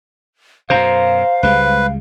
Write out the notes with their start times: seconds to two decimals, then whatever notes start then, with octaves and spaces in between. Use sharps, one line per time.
0.70 F#2 B2 C5 F5 A#5
1.43 C#2 G3 G#3 B4